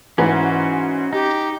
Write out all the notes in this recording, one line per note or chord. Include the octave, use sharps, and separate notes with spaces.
G#2 E3 C#4 F#4
D#4 G4